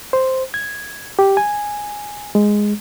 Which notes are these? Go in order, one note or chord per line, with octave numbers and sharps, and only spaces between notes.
C5
G#6
G4
G#5
G#3